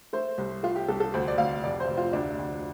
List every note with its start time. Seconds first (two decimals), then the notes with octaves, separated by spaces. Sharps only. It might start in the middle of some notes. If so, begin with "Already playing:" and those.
0.13 A3 C5
0.38 C2
0.63 A3 F4
0.76 G4
0.88 C2 A4
1.00 A4
1.14 D2 C5
1.28 D5
1.38 D2 F5
1.64 F1 D5
1.80 C5
1.88 F1
1.97 F4
2.13 D2 D4
2.39 D2